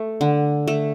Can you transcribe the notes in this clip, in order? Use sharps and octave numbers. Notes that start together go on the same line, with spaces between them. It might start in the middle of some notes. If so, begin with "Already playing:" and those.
Already playing: A3
D3
A3